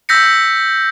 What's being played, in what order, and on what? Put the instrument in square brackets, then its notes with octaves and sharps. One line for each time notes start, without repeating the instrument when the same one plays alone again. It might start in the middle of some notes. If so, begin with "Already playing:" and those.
[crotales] E6 G6 A#6 B6 C#7